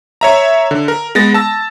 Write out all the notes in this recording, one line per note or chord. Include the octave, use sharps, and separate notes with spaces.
C#5 E5 A#5
D3
A#4
G#3 B3 A6 A#6
A5 E6 A#6